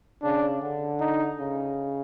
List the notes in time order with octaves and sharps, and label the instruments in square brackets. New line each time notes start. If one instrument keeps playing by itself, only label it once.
[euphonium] C#3 [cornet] D4
[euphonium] D3
[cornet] D#4
[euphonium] C#3